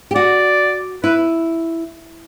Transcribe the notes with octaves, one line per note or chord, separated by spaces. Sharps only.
G4
F#4 D5
E4 B4